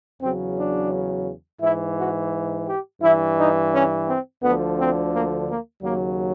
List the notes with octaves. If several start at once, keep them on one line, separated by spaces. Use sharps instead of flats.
E2 C#3 F#3 C4
D4
G#2 E3 E4
F#4
G4
G2 E3 E4
D#4
C#4
C4
D2 D3 F3 B3
C4
A#3
A#3
D#2 C#3 F#3 A#3